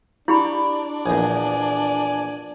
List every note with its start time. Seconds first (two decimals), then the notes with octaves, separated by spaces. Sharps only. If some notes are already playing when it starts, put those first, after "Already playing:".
0.28 D4 E4 G4 B5
1.06 A#1 E2 G#5